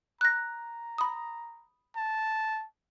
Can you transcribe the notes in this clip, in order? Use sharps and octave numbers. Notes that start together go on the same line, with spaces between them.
A#5 F#6 A#6
B5 D#6
A5